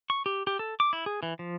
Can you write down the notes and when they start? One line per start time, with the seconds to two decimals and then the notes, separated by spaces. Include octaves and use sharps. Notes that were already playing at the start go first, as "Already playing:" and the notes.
0.10 C#6
0.26 G4
0.47 G4
0.59 A4
0.80 D6
0.93 E4
1.06 G#4
1.23 E3
1.39 F3